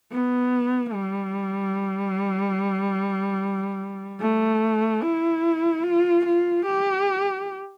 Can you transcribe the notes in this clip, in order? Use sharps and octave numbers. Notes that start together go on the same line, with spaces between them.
B3
G3
A3
E4
F4
F4
G4